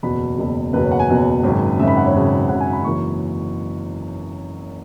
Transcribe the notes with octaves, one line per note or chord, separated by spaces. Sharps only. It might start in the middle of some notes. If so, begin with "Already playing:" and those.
F#1 E2 B2 B5
F#1 E2 B2
F#1 E2 B2 B4
C#5
F#5
G#5
F#1 E2 B2
G#1 F#2 C#3
G#1 F#2 C#3 E5
B5
F#5
C#5
G#1 F#2 C#3
G#1 F#2 C#3 F#5
G#5
B5
F#1 F#2 E3 C#6